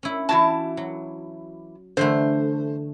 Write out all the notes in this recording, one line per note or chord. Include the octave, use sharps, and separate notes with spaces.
C#4 E4
E3 E4 F#4 A5
F#3
D3 E3 A3 C5